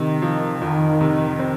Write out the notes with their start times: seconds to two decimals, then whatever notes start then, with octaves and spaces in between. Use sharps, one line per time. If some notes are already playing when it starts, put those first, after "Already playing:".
Already playing: C3 D#3
0.22 F3
0.61 F2 D#3
1.01 C3
1.39 C4